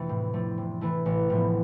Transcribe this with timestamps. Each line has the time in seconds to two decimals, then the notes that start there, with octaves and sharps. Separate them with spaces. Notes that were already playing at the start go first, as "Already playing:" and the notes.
Already playing: F2 C3 E3 A3 B3 D4
0.09 A2
0.33 F3 A3 D4
0.58 C3
0.81 E3 A3 E4
1.06 A1
1.30 A2 F3 B3